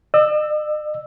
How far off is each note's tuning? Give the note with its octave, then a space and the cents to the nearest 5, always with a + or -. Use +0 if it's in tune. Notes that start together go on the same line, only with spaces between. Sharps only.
D#5 -45 E6 +0